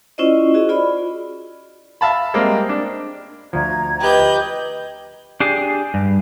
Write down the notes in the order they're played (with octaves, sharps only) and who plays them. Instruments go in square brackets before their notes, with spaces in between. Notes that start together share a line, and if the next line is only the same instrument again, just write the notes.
[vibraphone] C#4 E4 F4 C5 D5 D#5
F#4 G#4 D#5
F4 D5 B5
[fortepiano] E5 F5 A5 B5
G3 G#3 A#3 C4
D4
[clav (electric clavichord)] D2 F3 [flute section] A#5 G#6
[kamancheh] G4 D#5 [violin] B4 G6
[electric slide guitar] D4 G4 G#4
G2